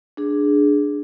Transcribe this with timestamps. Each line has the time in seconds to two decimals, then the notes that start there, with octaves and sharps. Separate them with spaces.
0.17 D4 G#4